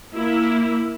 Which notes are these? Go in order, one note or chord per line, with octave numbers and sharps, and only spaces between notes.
A#3 E4